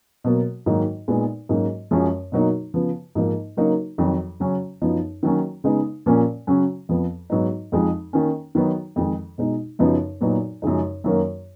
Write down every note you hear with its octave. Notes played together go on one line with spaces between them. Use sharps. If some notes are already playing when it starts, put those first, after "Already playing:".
B2 F#3 A#3
G#2 D#3 F#3 A#3 D#4
A#2 G#3 B3 D#4
G#2 F#3 A#3 C#4
F#2 F3 G#3 C#4
B2 F#3 A#3 D#4
C#3 F3 B3
G#2 F3 A#3 D#4
C#3 F#3 A#3 D#4
F2 D#3 F#3
C#3 F#3 C#4
F#2 F3 B3 D#4
D#3 F#3 A#3 C#4
C#3 G#3 B3 D#4
A#2 F3 A#3 C#4
C#3 F#3 C#4
F2 F3 B3
G#2 F#3 B3 D#4
F2 F3 G#3 D#4
D#3 A#3 C#4
D#3 F#3 B3 D#4
F2 D#3 G#3
B2 G#3 D#4
F#2 C#3 F3 B3 D#4
A#2 F#3 B3 D#4
F#2 C#3 F3 G#3 D#4
F#2 D#3 F#3 A#3